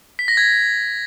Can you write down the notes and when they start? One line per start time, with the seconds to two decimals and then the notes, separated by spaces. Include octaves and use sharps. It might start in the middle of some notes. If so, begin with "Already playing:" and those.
0.19 B6
0.28 A#6
0.37 G#6